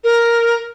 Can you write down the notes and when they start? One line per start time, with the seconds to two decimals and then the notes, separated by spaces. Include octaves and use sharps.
0.04 A#4